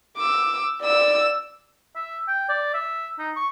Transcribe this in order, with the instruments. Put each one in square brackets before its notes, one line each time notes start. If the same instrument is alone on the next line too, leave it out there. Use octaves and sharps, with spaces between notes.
[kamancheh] D6 E6
D5 E6
[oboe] E5
G5
D5
E5
D#4
C#6